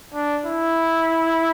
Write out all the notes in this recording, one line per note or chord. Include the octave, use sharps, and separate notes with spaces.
D4
E4